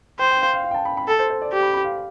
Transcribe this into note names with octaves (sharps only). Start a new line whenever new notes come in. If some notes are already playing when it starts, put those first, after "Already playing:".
C5 G5
G5
F5
F5
F5
G5
A5
B5
B5
A4 A5
C5
C5
D5
G4
B5
B5
F5